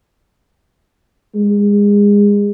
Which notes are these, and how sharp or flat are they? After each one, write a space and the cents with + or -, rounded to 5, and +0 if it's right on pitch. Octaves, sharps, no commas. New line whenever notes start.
G#3 -30